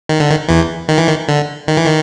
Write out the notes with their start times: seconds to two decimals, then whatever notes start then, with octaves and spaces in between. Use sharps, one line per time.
0.09 D#3
0.20 D3
0.30 D#3
0.48 E2 E3
0.89 D#3
0.98 E3
1.08 D#3
1.28 D3
1.68 D#3
1.77 E3
1.86 D#3